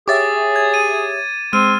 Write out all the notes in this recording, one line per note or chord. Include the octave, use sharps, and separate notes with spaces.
G4 G#4 C#5 E5 D6 A6
G#6
D#7
G#3 C4 F6 D#7